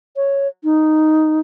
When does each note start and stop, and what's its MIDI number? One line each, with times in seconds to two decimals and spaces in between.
0.16 0.48 73
0.64 1.40 63